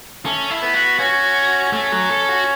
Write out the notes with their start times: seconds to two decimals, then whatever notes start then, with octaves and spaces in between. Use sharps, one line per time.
0.25 A3 C#4
0.50 E4
0.62 B3
0.74 F#4
0.99 C#4 F#4
1.73 A3 C#4
1.92 F#3
2.10 A4
2.29 F#4